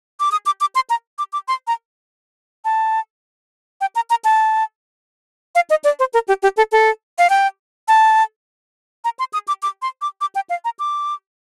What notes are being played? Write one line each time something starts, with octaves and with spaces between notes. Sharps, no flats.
D6
D#6
D6
D6
C6
A#5
D6
D6
C6
A#5
A5
G5
A#5
A#5
A5
F5
D#5
D5
C5
A#4
G4
G4
A4
A4
F5
G5
A5
A#5
C6
D#6
D6
D6
C6
D6
D6
G5
F5
A#5
D6